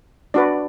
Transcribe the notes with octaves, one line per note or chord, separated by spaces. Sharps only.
D4 F#4 B4 D5